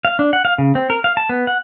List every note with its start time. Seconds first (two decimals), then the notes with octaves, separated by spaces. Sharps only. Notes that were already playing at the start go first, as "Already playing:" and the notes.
0.05 F5
0.19 D4
0.33 F#5
0.45 F5
0.58 C#3
0.75 C4
0.90 A#4
1.04 F5
1.17 A5
1.29 B3
1.47 F#5